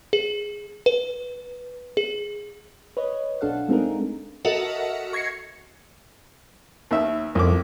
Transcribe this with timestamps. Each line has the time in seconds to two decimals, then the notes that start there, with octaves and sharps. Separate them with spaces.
0.13 G#4
0.86 B4
1.97 G#4
2.97 B4 C#5 D#5
3.41 B1 D4 A4 F5 F#5
3.68 G#3 A3 C4 D#4 G#4 A#4
4.45 F#4 A4 A#4 D#5 E5 F#5
5.13 C#6 G#6 A#6 C7 C#7
6.91 D#2 E5
7.35 C2 F2 D6